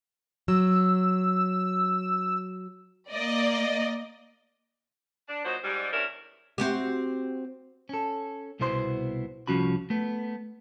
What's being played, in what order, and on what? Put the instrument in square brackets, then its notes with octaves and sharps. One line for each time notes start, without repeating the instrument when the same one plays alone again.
[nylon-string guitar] F#3 [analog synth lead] E6
[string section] A#3 D5 D#5
[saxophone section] D4
A#2 F#3 D#4 F#4 C5
G#2 G3
E2 G2 C#4 A#4 D5 E5
[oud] C4 F#4 G4
[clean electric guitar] C#4 A4
C2 B2 B3 E4 C5 C6
C2 F3 C#4 F#4 B5
A3 B3